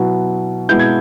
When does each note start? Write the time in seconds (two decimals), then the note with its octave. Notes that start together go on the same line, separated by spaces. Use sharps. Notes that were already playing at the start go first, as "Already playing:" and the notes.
Already playing: B2 F#3 B3 E4
0.69 B2 G#3 B3 E4 G6
0.79 G#6